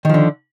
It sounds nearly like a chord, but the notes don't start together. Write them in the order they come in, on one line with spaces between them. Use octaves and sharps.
D#3 F3 D3